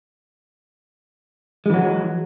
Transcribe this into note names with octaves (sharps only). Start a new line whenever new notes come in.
E3 F#3 G#3